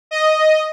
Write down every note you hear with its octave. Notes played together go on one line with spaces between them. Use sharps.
D#5